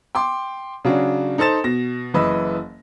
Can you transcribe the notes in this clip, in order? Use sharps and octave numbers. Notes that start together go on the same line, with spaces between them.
G5 C6 D6
C#3 F#3 D4 F#4
D#4 A4 C5 A6 E7
B2 A#6
F#1 E3 D#5 B5 E6